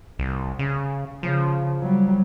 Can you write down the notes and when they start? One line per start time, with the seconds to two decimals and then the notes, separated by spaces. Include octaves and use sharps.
0.19 C2
0.59 C#3
1.23 C#3 F3
1.81 F#3 G3